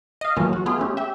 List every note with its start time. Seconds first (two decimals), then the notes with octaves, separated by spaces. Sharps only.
0.21 D#5 F5
0.36 E3 F#3 A3 A#3 C#4 F4
0.53 F#4
0.66 A3 B3 F4 G#4
0.78 G#3 A3 C#4 G4
0.97 G4 E5